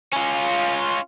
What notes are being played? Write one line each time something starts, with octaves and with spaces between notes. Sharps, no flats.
C#4 F4